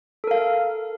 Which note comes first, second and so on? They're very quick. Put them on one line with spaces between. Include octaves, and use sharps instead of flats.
A4 A#4 F5